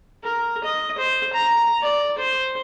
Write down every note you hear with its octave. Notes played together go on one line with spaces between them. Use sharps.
A#4
D#5
C5
A#5
D5
C5